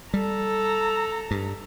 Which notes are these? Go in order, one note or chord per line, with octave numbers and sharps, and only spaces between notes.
G3 A4 A#5
G2